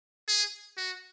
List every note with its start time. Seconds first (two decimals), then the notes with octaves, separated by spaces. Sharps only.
0.28 G#4
0.77 F#4